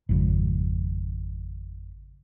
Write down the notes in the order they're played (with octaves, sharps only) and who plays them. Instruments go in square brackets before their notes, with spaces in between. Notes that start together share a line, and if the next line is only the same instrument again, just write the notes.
[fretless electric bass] G#1 F2 C#3